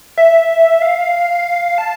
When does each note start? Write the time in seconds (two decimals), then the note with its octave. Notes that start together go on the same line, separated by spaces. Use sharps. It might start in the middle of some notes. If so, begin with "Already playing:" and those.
0.18 E5
0.82 F5
1.78 A5